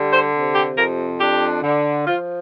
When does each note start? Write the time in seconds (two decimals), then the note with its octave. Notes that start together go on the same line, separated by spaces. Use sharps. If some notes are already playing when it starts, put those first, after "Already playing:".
Already playing: D3 G3
0.13 C5
0.34 C3
0.55 G4
0.76 F2 A#4
1.19 D4 G4
1.63 D3
2.06 F3 F4